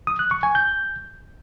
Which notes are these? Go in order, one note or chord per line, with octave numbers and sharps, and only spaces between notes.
D#6
F#6
C#6
G#5
G6